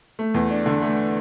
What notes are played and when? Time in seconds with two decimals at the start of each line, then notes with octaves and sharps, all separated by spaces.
0.19 A3
0.34 E2
0.51 D4
0.66 D3
0.82 A3